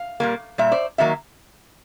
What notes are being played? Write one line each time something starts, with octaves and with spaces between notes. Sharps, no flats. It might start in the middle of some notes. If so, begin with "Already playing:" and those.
Already playing: F5
A#2 G3 A#3
A#2 G3 E5
C5 D5
D#3 F#3 A#3 E5